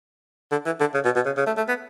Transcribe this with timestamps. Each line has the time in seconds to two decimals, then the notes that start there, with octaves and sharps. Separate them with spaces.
0.52 D3
0.66 E3
0.80 D3
0.94 C#3
1.05 B2
1.16 B2
1.26 C#3
1.37 C#3
1.47 A3
1.57 A3
1.68 B3